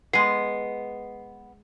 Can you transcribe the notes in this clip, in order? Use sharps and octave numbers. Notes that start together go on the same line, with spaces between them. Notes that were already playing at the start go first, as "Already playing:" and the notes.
G#3 B3 G#4 C7